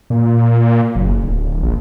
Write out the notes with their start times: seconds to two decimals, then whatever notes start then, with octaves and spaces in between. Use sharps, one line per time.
0.10 A#2
0.96 F#1
1.24 D1
1.63 A#1